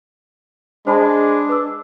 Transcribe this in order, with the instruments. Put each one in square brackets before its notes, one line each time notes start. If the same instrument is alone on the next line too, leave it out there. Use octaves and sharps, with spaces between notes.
[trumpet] G#3 [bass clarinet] D4 [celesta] C5 A5 B5
[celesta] B4 D6 E6